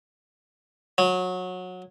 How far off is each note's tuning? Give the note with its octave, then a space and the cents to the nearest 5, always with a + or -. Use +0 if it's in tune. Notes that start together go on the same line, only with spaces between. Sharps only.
F#3 -20